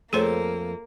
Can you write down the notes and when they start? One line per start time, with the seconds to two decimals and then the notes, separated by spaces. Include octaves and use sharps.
0.13 F2 A3 A#3 G#4 A4 C5 C#5